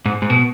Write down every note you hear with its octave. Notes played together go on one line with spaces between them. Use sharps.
G#2
G#2
B2